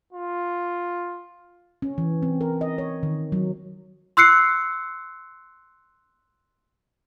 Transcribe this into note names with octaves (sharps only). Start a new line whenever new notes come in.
F4
C#4
E3
C4
A#4
D#5
C#5
D#3
F#3
C6 E6 F#6 C7 C#7